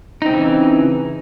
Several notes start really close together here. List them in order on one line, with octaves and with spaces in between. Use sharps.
D#4 C4 C#3 E3